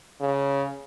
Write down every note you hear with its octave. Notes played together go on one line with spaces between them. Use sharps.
C#3